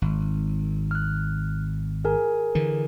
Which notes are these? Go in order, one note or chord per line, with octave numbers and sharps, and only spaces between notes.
G#1
F6 F#6
G#4 A#4 G#5
D3 E3